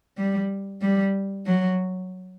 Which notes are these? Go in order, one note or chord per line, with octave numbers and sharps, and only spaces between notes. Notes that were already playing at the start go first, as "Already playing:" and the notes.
G3
G3
F#3